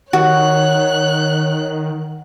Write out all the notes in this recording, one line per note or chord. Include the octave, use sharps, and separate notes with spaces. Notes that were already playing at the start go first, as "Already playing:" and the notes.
D#3 F#4 C#5 F#6